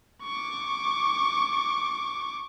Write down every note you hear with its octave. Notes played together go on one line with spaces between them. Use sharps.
C#6 D6